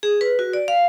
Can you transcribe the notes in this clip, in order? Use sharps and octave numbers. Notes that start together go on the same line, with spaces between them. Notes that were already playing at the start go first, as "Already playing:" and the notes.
G#4
B4
F#4
D5
F5